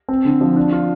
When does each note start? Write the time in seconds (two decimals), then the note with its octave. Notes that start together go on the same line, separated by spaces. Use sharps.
0.09 C4
0.25 D3
0.41 F3
0.56 D4
0.72 F4